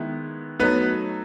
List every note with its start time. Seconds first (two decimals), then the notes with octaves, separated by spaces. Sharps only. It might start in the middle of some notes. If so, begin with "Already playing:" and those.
Already playing: D#3 G#3 B3 E4
0.60 F#3 A3 B3 D#4 B4